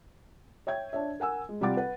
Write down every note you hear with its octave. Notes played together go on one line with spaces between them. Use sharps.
C#5 E5 G5 G#6
D4 C#5 E5
A#4 F#5 G#5 E6
G#3
C3 G3 F4 F#5 D6 A6
B4 F#5